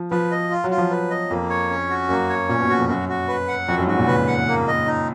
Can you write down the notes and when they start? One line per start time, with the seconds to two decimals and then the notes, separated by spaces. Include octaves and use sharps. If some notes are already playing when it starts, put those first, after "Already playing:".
Already playing: F3
0.11 F3 B4
0.31 D#5
0.51 F4
0.64 F#3
0.70 F4
0.78 F3
0.90 B4
1.11 D#5
1.30 F2 A#3
1.49 C#5
1.70 C#4
1.90 F#4
2.09 F#2 A#3
2.29 C#5
2.49 A#2 C#4
2.59 B2
2.69 A#2 F#4
2.79 F2
2.89 F#2 F#4
3.08 F#4
3.28 B4
3.48 F#5
3.68 F2 F#4
3.78 F#2
3.87 G#2 F#4
3.98 A#2
4.07 C#3 B4
4.27 F#5
4.48 A#3
4.67 D#5
4.86 D#4